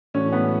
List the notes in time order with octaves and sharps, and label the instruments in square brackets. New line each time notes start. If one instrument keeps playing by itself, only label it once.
[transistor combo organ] A2 E3 A3 D4 F#4 [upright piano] C#4
[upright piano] B3